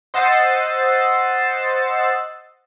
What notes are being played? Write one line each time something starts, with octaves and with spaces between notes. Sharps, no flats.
C5 D#5 F#5 E6 A6 C7